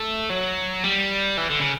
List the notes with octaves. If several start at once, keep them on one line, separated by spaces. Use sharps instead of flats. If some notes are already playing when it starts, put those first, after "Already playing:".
Already playing: A3
F#3
G3
E3
D3
C#3